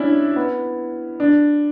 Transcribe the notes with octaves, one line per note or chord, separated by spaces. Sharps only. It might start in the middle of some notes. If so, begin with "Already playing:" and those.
Already playing: C#4 D4 E4
B3
D4